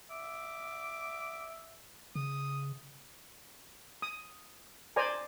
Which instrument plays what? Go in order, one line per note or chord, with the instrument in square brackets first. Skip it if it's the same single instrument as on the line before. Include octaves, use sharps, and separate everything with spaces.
[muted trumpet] E5 [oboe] D6
[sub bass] C#3 [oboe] D#6
[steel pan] D#6
C5 D5 G#5 A#5